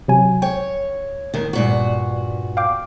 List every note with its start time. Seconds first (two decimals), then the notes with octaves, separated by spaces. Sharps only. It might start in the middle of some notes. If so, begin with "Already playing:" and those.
0.08 C3 F#3 G#5
0.42 C#5 G5
1.34 D#2 D#3
1.53 G2 A#2 F#4
2.57 F5 G5 D6